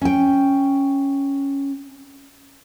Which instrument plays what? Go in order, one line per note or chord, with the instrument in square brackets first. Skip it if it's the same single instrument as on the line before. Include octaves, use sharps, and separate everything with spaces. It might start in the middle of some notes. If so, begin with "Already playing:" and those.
[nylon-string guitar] C#4 G5